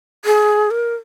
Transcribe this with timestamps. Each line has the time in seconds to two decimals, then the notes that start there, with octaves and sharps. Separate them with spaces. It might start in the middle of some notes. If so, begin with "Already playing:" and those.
0.25 G#4
0.71 A#4